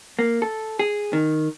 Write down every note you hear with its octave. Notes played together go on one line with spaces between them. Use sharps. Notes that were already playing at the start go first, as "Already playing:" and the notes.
A#3
A4
G#4
D#3